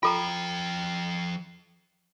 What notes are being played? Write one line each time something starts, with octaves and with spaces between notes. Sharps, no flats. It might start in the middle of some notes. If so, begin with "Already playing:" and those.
F3 F4 A4 G5 A#5